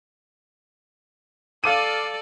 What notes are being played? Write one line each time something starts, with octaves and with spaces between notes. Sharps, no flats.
A4 D5 F5 D6 D#7